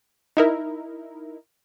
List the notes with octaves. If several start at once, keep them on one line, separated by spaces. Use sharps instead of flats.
D#4 E4 A#4